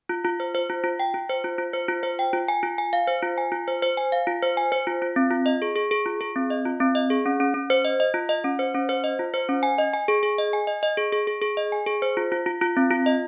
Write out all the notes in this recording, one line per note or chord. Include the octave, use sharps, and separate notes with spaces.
F4
F4
C5
C5
F4
F4
G5
F4
C5
F4
F4
C5
F4
C5
G5
F4
G#5
F4
G#5
F5
C5
F4
G#5
F4
C5
C5
G#5
F5
F4
C5
G#5
C5
F4
F4
C4
F4
D#5
G#4
G#4
G#4
F4
G#4
C4
D#5
F4
C4
D#5
G#4
C#4
C#4
C#4
C5
D#5
D#5
F4
D#5
C#4
C5
C#4
C5
D#5
F4
C5
C#4
G#5
D#5
G#5
G#4
G#4
D#5
G#5
D#5
D#5
G#4
G#4
G#4
G#4
D#5
G#5
G#4
C5
F4
F4
F4
F4
C4
F4
D#5